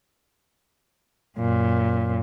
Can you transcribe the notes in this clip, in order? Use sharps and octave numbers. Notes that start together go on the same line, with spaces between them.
F#2 A#2